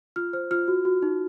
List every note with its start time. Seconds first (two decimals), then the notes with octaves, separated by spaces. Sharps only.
0.16 F4 F6
0.33 C5 F6
0.51 F4 F6
0.68 F#4
0.85 F#4
1.02 D#4